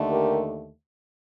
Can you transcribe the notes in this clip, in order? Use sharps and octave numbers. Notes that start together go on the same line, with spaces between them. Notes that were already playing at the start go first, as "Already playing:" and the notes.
Already playing: D#2 D3 A3
G4 A#4